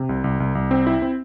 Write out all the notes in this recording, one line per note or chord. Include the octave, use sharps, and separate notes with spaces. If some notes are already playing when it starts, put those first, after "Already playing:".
Already playing: C3
C2
C2
C2
C2
C4
E4
C4